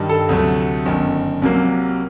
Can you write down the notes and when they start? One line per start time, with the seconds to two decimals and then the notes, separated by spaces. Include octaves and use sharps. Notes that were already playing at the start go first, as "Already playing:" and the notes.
Already playing: G2 D#3 G3
0.10 A4
0.29 D2 C3 F#3 A3
0.86 G1 F#2 D#3
1.42 C2 C3 F#3 A#3